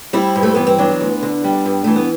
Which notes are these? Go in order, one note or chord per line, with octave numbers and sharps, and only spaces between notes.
G3 C4 E4
G2
A3
E3 B3
C4
F#3 B3 D4
D2
D3
G3
G2
E3 A3
B3